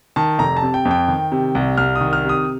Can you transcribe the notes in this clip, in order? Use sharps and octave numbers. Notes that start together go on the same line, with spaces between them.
D#3 A5
F1 A#5
A5
C3
G5
F2
G5
D#3
C3
C2
C2 F6
D#6
D#3
F6
C3
D#6